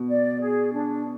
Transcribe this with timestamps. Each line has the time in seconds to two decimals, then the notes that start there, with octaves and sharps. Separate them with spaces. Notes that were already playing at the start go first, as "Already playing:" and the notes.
Already playing: B2
0.09 D5
0.41 G#4
0.73 D4